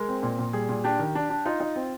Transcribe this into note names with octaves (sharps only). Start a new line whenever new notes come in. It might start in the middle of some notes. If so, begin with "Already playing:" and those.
Already playing: G#3 A#4
C4
A#2
A#2
G3 G#4
A#2
D4 G4
D#3
D4
D4
D#4 F4
D#4
C4